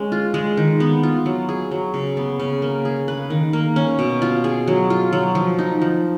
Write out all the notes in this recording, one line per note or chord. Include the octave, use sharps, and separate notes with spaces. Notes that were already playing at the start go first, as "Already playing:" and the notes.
Already playing: G#3 C#4
F4
G#3
D#3
B3
F4
F#3
G#4
F#3
C#3
B3
C#3
A#3
G#4
B4
D#3
A#3
C#4
B2
F4
G#4
F#3
F4
F#3
F3
D#4
F3